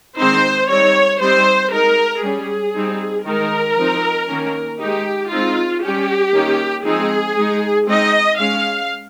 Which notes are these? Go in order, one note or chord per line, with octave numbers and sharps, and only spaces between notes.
D#3 G#3 C4 D#4 C5
G3 C4 D#4 C#5
G3 C4 D#4 C5
G#3 D#4 A#4
G3 C#4 G#4
G3 C4 D#4
D#3 G#3 D#4 A#4
F3 C4 D#4
D#3 A#3 C#4
G#3 D#4 G4
G#3 C4 D#4 F4
G3 C#4 G4
D#3 A#3 C#4
F3 G#3 C4 D#4 G#4
G#3 D#4
G#3 C4 D#4 D#5
G#3 C#4 F5